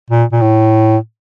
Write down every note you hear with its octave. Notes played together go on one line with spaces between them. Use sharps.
A#2
A#2
A2